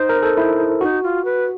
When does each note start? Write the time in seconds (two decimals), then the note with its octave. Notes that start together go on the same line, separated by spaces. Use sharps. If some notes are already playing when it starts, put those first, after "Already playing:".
Already playing: D#4 C5
0.09 A#4
0.23 A4
0.37 E4
0.81 D#4 F#4
1.03 F4
1.25 B4